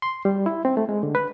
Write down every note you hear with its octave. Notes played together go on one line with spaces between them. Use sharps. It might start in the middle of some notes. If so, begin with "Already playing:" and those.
C6
G3
E4
C4
A3
G#3
D3
B4